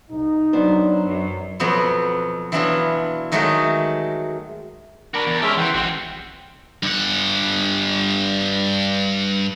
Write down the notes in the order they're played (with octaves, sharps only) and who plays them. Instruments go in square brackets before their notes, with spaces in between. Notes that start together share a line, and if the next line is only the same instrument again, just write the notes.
[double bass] C2 [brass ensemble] D#4
[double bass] F#3 [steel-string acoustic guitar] B3 D4 C5
[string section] F#2
[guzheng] F2 B2 F#3 B3 C4
E3 F#3 B3 D4 E4 F4
D#3 F#3 G#3 A3 F#4 A#4
[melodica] D4 A#4 B5 [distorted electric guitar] F#4 D5
[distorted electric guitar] E2
[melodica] G#3 C#4 E5 [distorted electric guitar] G4 A#4
[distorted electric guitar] E3 [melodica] F#5 G5 C6
[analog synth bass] A1 [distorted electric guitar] C4 F#4
[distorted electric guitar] G2 F#5